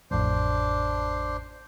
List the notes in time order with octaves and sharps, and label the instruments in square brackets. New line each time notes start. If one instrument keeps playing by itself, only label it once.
[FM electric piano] A1 F2 A2 [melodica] D4 C5